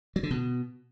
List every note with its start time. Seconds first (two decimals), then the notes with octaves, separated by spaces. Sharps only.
0.16 F#3
0.23 D3
0.31 B2